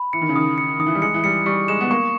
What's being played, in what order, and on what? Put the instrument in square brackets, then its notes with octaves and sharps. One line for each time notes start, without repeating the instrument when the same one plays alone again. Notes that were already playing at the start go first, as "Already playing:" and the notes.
Already playing: [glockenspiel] B5
[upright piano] E3 [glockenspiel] C#7
[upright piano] D#3
C#3
[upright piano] D#3 [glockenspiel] D#6
[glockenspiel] C#7
[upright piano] D#3 [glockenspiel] D#6
[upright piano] E3
G3
[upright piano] G#3 [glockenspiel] C#7
[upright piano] E3
[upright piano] G3 [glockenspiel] C#7
[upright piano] G3 [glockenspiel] C#6
[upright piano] G#3 [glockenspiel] E7
[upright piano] B3
[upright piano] A#3 [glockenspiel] C#6